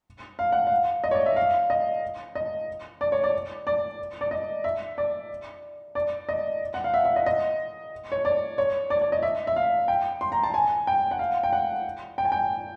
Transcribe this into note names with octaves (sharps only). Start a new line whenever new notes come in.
F5
F#5
F5
D#5
C#5
D5
E5
F5
D#5
D#5
D5
C#5
D5
D5
D5
D#5
E5
D5
D5
D#5
F#5
F5
E5
E5
D#5
D#5
C#5
D5
C#5
D5
D5
D#5
E5
E5
F5
G5
C6
A#5
A5
G#5
G5
F#5
F5
G5
F#5
G5
G#5
G5